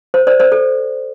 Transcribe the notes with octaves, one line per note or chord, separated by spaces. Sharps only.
C5
C5 D5
C5 D5
A4